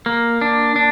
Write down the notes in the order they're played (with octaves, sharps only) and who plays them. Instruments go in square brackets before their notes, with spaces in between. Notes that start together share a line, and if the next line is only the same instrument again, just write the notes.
[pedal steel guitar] A#3
D4
D4